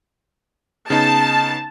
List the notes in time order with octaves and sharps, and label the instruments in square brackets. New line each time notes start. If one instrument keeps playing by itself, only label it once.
[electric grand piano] C#3 B3 D#4 [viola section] A5